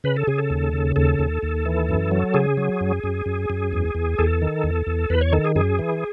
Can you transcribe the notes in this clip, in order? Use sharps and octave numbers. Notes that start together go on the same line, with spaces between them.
C#3 B4
A4
C#3 G#4
A4
D#2
C#3
D#2 A4
D#2
D#2
E3
F#2
F#3
C#3 G#4
F#3
F#2
F#2
F#2
F#2
E2
E2
E2 A4
D#3
E2
E2
E2 B4
C#5
D#3 A4
G#4
F#2 G#4
E3